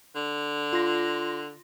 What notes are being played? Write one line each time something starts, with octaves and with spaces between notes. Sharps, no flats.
D3
F4 C6 A#6